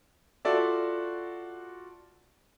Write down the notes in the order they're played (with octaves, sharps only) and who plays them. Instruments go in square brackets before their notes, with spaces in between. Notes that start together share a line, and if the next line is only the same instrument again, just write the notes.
[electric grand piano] F4 F#4 A4 D5 E5